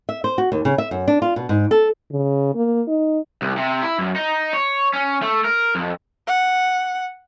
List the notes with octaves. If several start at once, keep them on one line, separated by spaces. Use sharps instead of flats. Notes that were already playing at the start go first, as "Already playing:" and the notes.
E5
C5
F#4
D#2
C#3
E5
F#2
D4
F4
B2
G#2
A4
C#3
A#3
D#4
C2
C3
E4
F#2
D#4
C#5
C#4
A3
A#4
F2
F#5